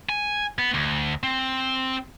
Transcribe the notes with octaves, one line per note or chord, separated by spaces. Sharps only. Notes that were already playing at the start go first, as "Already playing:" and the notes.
G#5
B3
D2
C4